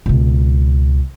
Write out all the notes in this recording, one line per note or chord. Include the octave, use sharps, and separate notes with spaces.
C#2 B2